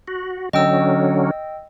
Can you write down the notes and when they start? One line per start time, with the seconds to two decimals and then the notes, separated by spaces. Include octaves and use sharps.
0.08 F#4
0.53 D3 F#3 C#4 D#5 G5 E6